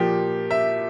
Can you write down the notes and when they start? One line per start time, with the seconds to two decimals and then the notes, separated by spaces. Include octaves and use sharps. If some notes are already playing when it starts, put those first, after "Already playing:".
Already playing: A#2 F3 G4
0.51 E5